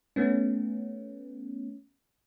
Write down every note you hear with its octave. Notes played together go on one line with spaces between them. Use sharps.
A3 B3 C#4